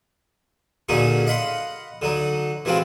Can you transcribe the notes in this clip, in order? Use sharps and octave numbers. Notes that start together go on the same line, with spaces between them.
A#2 D3 F#3 C#4 D#4 G#4
D#5 F5 F#5 B5 C6
D3 F#3 D#4
E3 F#3 G#3 C4 F4